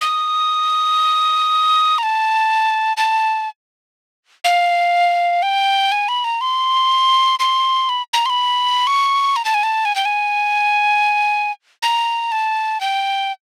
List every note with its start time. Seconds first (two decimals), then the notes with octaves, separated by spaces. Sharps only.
0.01 D#6
1.98 A#5
2.03 A5
2.97 A5
4.44 F5
5.42 G5
5.92 G#5
6.08 B5
6.24 A#5
6.41 C6
7.40 C6
7.89 B5
8.13 A#5
8.26 C6
8.30 B5
8.87 C#6
9.36 A#5
9.45 A5
9.54 G#5
9.63 A5
9.85 G#5
9.96 G5
10.05 G#5
11.83 A#5
12.32 A5
12.81 G5